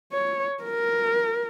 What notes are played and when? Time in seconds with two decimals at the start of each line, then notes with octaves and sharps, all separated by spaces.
0.12 C#5
0.63 A#4